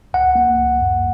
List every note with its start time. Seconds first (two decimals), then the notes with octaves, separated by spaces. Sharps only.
0.13 C#2 F#5
0.35 A#3
0.58 C#2
0.80 F#2